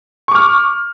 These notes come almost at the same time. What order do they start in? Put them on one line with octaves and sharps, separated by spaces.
C#6 D6 F6